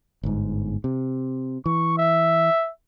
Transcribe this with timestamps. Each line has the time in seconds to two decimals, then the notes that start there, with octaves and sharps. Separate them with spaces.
0.23 G1 G#2
0.84 C3
1.66 E3 C#6
1.98 E5